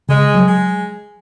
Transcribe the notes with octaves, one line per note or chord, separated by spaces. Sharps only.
C#3 G#3
F#3
G#3